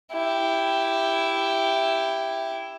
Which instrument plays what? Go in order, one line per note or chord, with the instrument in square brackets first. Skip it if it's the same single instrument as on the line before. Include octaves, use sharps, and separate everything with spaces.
[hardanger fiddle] E4 G4